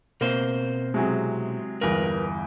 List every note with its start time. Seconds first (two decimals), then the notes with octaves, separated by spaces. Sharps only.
0.21 B2 A#3 C4 C5
0.94 C3 F#3 G#3 E4 G#4
1.81 G1 E2 G2 A#4 B4